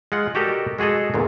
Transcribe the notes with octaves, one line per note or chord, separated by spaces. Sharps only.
G#3 F4 F#5
F#4 G4 A4 A#4 D5 D#5
G#3 F#4 G#4 A4 D#5
E2 A#2 D3